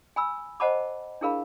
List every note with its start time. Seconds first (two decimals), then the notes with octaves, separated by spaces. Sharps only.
0.16 G#5 B5 E6
0.60 C5 D#5 F#5 A5 B5 D6
1.21 D4 E4 G#4 A#4 F5 B5